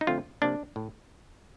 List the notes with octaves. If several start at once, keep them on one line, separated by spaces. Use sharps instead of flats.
D#4
D3 F3 A3 C4 F4
C3 F3 A#3 D4
A2